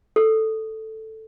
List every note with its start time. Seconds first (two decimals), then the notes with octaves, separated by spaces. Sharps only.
0.16 A4